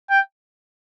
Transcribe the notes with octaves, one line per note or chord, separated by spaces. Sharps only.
G5